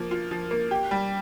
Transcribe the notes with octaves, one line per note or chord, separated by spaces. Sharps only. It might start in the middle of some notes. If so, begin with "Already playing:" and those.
Already playing: F3 A#3
F4
F3
A#3
G4
G3